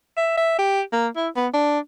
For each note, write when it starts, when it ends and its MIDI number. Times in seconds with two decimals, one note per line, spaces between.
0.17 0.33 76
0.37 0.58 76
0.59 0.81 67
0.93 1.08 58
1.16 1.29 64
1.36 1.47 59
1.53 1.79 62